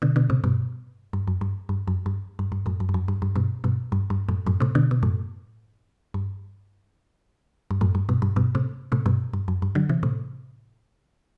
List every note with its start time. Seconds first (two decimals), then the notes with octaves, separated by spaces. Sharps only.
0.02 B2 D3
0.16 B2 D3
0.30 A2 C3
0.44 G2 B2
1.13 G2
1.27 F#2
1.41 G2
1.69 G2
1.88 F#2
2.06 G2
2.39 G2
2.52 G2
2.66 F#2 A2
2.80 F#2
2.89 G2
2.94 F#2
3.08 G2
3.22 G2
3.36 G2 B2
3.64 G2 B2
3.92 G2
4.10 G2
4.29 F#2 A2
4.47 F#2 A2
4.60 A2 C3
4.75 B2 D3
4.91 B2
5.03 F#2 A2
6.14 G2
7.71 G2
7.81 F#2 A2
7.95 G2
8.09 G2 B2
8.22 G2
8.36 G2 B2
8.55 A2 C3
8.92 A2 C3
9.06 G2 B2
9.33 G2
9.48 F#2
9.62 G2
9.75 D3 F#3
9.89 C3 E3
10.03 A2 C3